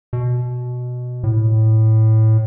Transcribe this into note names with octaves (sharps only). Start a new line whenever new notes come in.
B2
A2